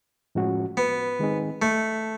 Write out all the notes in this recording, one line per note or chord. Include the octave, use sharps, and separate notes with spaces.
A2 F3 G#3 C#4 F#4
B3
D#3 G#3 C4 D#4 G#4
A3